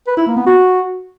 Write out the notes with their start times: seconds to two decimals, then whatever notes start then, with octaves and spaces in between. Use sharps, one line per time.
0.07 B4
0.17 E4
0.27 A#3
0.37 B3
0.47 F#4